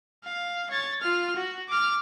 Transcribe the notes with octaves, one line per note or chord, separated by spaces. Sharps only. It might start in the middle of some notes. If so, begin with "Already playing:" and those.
F5
C#5 A6
F4 F6
F#4
D6 F6